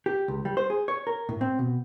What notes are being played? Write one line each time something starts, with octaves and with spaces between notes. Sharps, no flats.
G4
C#2
G3
C5
G#4
C#5
A#4
A2
C4
B2